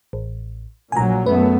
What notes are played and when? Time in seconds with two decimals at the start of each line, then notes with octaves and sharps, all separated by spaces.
0.13 A1
0.92 A#1 A#2 F#3 G#5 A#5
1.26 F#2 A3 B3 B4